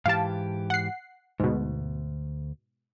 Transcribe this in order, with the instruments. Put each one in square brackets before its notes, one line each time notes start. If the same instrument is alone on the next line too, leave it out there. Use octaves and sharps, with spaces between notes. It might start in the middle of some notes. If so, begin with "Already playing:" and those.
[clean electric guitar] G#2 E3 G4 [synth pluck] F5 A5
[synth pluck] F#5 C7
[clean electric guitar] D2 [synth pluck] G#2 B2